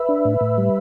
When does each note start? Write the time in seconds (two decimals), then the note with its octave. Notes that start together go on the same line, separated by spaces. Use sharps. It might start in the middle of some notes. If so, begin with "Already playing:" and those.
Already playing: B4 E5
0.09 D4
0.25 A2
0.41 A2
0.58 G3